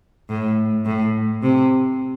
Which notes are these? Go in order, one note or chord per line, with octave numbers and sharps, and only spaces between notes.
A2
A2
C3